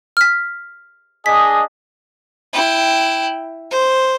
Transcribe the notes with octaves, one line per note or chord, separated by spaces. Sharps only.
F6 B6
D4 G#4 D#5 B6
E4 G5
C5